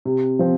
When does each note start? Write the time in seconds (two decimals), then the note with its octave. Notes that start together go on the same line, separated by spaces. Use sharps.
0.05 C3
0.39 F3 C4